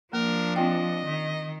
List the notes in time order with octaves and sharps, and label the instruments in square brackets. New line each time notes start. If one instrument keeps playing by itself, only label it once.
[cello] F3 D4 [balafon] A#3 [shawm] A#4
[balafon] C4 F4 G5 [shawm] D#5
[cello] D#3